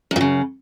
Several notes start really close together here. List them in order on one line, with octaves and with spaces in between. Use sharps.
F#2 A#2 C#3